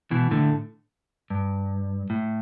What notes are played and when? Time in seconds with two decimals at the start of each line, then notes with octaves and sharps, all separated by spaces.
0.11 B2 E3
0.31 A2 D3
1.30 G2
2.10 A2